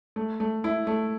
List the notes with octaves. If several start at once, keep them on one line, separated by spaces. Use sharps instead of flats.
A3
A3
E4
A3